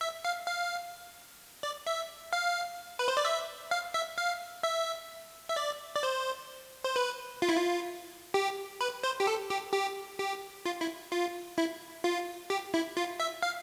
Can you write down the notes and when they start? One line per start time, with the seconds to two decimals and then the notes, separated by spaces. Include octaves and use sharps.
0.01 E5
0.25 F5
0.47 F5
1.63 D5
1.87 E5
2.33 F5
2.99 B4
3.08 C5
3.17 D5
3.25 E5
3.71 F5
3.94 E5
4.18 F5
4.63 E5
5.49 E5
5.56 D5
5.96 D5
6.03 C5
6.84 C5
6.96 B4
7.42 F4
7.49 E4
7.56 F4
8.34 G4
8.81 B4
9.04 C5
9.20 G4
9.27 A4
9.50 G4
9.73 G4
10.19 G4
10.65 F4
10.81 E4
11.12 F4
11.58 E4
12.04 F4
12.50 G4
12.74 E4
12.97 F4
13.20 E5
13.43 F5